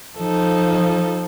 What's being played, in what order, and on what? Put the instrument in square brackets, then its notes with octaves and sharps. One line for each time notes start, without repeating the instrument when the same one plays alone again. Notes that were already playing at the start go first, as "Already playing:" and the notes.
[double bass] F3 [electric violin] D#4 A4